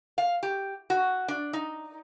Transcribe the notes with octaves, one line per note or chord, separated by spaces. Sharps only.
F5
G4
F#4
D4
D#4